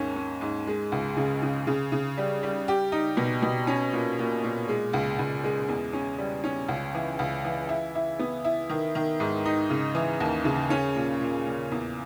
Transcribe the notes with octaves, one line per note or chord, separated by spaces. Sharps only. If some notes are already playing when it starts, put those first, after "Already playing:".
Already playing: D#2 G#2 C#4
C#4
G#2
G#3
C#2
C#3
C#3
C#3
C#3
G3
G3
G4
D#4
B2
B2
C#4
A#2
A#2
A#2
G#3
C#2
C#2
G#3
E2
C#4
G3
C#4
C#2
E3
C#2
E3
E4
E4
B3
E4
D#3
D#3
G#2
D#4
C#3
E3
D#2
C#3
C#4
A#2
A#2
A#2
E2